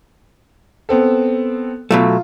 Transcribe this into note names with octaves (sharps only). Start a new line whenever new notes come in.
B3 C4 A4
B2 F#3 A3 F4